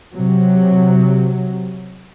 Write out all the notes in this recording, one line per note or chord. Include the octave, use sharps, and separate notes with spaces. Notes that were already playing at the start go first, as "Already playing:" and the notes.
C3 F#3